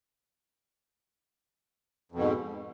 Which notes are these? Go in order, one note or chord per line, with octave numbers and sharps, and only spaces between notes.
F2 G#2 B2